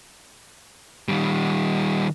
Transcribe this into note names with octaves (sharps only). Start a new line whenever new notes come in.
D#3 G3